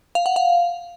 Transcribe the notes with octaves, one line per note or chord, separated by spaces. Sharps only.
F5
F#5
F5